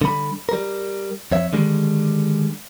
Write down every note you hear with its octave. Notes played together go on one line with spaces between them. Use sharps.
D3 G3 B5
G3 A#4
F2 C#5 E5
D3 D#3 G3 G#3